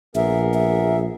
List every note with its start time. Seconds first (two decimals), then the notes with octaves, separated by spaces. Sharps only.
0.15 A#1 B3 G#4 A#4 E5
0.54 E5